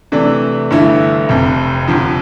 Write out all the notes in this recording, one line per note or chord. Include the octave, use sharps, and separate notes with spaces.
C3 E3 A3 D4
G1 G2 E3 A3 E4
F1 F2 C3
G1 F2 C3 F3